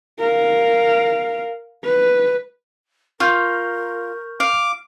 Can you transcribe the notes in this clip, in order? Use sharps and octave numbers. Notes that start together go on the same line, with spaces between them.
A#4 F5
B4
F4 A#4 C#6 F6 G6
F5 D6